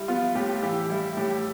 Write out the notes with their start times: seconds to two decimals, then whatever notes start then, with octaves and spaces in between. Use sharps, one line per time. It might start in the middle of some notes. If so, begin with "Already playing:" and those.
Already playing: G3 E4
0.08 B3 F4
0.35 A2 G4
0.63 E3 G4
0.90 G3 E4
1.17 A2 G4